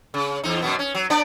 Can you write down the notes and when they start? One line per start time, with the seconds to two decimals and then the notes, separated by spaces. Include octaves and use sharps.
0.14 C#3
0.43 E2 D#4
0.62 F#2 B2 B3
0.79 C#4
0.95 F#3
1.10 B3 D4 D5